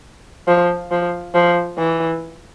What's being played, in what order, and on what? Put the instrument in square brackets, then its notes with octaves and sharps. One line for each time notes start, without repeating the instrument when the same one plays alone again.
[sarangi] F3
F3
F3
E3